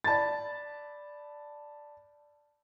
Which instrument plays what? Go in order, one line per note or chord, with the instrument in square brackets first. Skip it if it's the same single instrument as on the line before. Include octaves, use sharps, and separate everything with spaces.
[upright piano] D5 A5 B5 A6